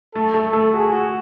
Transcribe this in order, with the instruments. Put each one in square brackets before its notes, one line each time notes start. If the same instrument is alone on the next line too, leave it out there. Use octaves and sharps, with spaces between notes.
[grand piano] A3 [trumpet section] A4
[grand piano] A3
[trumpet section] A4
[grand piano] A3
[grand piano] F#4 [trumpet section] G#4
[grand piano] F#4